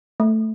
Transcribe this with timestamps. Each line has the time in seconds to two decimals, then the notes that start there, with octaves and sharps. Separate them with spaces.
0.20 A3